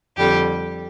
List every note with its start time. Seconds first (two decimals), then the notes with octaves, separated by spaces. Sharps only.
0.17 F2 D3 G3 G4